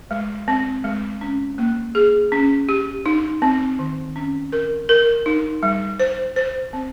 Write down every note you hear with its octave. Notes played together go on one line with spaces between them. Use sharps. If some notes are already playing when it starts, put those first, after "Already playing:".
G#3
C4
G#3
C#4
A#3
G#4
C#4
G4
D#4
C4
D#3
C#4
A#4
A#4
D#4
G3
C5
C5
C4